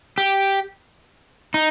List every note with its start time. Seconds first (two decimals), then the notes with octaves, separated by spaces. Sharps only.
0.18 G4
1.54 D#4